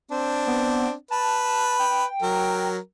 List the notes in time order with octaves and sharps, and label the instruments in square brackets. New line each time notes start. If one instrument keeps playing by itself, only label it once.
[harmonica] C4 D4
[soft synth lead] B3
[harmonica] B4 [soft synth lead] A5
[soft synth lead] G5
[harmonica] F#3 A#4